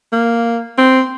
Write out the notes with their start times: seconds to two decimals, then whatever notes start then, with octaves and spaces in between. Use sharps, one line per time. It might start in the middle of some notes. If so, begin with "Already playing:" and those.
0.12 A#3
0.78 C4